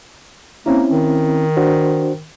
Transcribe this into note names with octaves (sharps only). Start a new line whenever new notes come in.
A#3 C4 C#4 E4
D#3
D4 F#4 C5